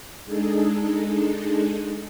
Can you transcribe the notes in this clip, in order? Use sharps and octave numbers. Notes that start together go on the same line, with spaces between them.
G#3 D4 D#4 G#4 A4